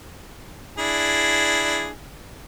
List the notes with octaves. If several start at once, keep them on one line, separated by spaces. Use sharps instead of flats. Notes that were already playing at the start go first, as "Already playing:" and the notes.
D4 E4 G#4